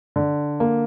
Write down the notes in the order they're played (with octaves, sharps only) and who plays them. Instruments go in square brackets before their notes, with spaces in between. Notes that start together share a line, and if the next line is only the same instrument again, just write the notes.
[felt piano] D3
A#3